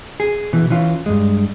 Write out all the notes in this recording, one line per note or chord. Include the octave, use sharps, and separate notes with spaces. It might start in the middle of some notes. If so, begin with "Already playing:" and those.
G#4
B2 E3
E3 C#4 F4
G2 G#3